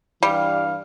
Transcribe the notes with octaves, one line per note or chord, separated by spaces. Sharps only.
G2 E3 G3 F5